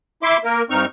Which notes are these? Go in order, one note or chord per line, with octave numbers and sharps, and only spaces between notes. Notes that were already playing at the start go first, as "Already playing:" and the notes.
E4 E5 C6 D6
A#3 A#4
G2 C4 D#4 C#6 F6